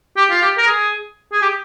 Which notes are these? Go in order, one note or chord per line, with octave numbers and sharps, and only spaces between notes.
G4
F4
G4
A#4
G#4
G#4
G4